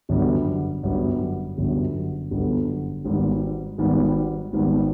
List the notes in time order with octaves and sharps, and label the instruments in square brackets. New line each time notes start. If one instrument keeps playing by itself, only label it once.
[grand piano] G1 F#2 D3 G3 B3
G1 F#2 D3 G3 B3
G1 F#2 D3 G3 B3
G1 F#2 D3 G3 B3
G#1 G#2 D#3 G3 B3
G#1 G#2 D#3 G3 B3
G#1 G#2 D#3 G3 B3